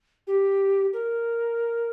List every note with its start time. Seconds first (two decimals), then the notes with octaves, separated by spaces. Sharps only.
0.27 G4
0.93 A#4